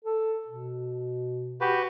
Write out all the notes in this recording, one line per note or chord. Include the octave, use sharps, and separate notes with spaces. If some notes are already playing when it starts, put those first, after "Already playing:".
A4
B2
F#4 G4 B4